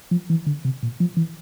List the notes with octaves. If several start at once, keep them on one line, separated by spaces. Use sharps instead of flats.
F3
E3
D3
C3
A#2
F3
E3